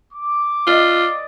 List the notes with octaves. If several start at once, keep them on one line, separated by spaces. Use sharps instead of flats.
D6
F4 D5 D#5